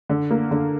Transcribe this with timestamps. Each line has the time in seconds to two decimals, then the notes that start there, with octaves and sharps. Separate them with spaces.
0.09 D3
0.31 A#3
0.51 D3